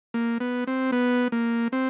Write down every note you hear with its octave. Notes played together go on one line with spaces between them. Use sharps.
A#3
B3
C4
B3
A#3
C4